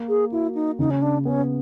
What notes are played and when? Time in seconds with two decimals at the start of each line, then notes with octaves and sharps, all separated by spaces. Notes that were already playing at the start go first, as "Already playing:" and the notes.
Already playing: A#3
0.09 G#4
0.31 E4 F#4
0.55 D#4
0.79 C#3 D#4
0.90 C#4
1.02 D4
1.25 B3 C#4